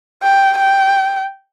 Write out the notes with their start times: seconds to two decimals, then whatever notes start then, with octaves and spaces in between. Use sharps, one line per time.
0.23 G5
0.58 G5